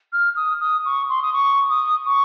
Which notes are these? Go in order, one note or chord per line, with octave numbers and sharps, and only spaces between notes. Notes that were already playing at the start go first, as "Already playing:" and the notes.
F6
D#6
D#6
C#6
C6
D#6
C#6
D#6
C#6